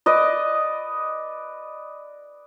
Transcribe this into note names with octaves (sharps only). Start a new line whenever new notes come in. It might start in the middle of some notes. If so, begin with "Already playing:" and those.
B4 D5 D#5